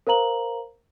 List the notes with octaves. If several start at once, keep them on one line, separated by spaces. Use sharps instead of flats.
A#4 C5 F5 A#5 F#7